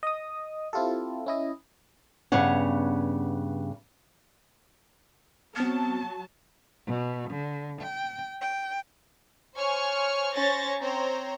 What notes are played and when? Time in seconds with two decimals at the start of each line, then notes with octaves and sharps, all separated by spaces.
0.03 D#5 D#6
0.73 C4 E4 F4 G4 A4
1.26 C#4 E4 D#5
2.32 G2 C#3 B3 C#5 F#5
5.56 F#3 B3 C4 A5 F6
6.87 B2
7.31 D3
7.82 G5
8.41 G5
9.56 C5 C#5 G#5 C#6 F6
10.33 C#4 C5 C#5 C#6 A6 A#6
10.82 C4 C5 C#5 A#5